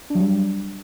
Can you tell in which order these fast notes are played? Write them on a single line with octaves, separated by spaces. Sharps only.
D4 F#3 G3